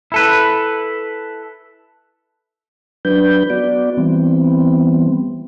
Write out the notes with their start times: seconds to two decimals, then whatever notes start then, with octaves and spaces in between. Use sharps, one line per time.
0.12 E4 A4 B4
3.05 F#3 D4 B4 G6
3.50 B3 F#4 D5
3.97 E3 G3 B3 C4